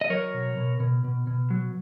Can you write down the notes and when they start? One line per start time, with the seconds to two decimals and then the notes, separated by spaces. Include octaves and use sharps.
0.01 D#5
0.10 F#3 A#4 C#5
0.34 B2
0.57 B2
0.80 B2
1.04 B2
1.27 B2
1.50 F#3